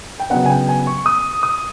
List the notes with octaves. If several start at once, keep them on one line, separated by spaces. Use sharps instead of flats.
G5
C#3 F#3 B3 D4 F#5
G#5
G5
G#5
C#6
D#6
D#6